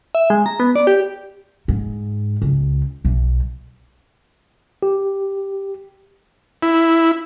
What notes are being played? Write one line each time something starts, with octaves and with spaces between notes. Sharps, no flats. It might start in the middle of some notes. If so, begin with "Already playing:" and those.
E5
G#3
A#5
B3
D5
G4
G#2
C#2
B1
G4
E4